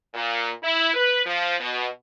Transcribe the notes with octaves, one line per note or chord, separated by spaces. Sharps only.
A#2
E4
B4
F3
B2